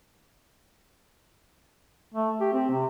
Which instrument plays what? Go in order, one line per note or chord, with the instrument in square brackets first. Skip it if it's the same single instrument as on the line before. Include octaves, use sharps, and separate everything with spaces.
[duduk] A3
G4
C4
C3